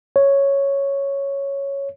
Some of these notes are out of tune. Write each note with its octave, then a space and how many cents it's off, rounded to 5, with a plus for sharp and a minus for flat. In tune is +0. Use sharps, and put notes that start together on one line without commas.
C#5 +0